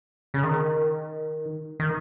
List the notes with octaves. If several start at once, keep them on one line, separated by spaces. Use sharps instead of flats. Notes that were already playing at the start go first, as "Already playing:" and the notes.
C#3
D#3
D#3